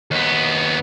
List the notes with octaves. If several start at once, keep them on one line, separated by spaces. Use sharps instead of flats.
D#2 B3